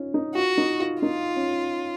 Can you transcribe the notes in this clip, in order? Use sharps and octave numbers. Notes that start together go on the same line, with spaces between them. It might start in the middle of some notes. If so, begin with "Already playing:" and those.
Already playing: C#4 D#4 F4
D#4
F4 F#4
D#4
F4
D#4 F4
C#4